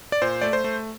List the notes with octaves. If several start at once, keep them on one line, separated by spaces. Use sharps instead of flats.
D5
A#2 C5
A3 D5
C5
A3